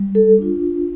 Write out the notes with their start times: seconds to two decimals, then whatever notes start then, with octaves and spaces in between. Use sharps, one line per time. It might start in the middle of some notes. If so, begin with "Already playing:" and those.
Already playing: G3
0.15 A4
0.38 D4 F4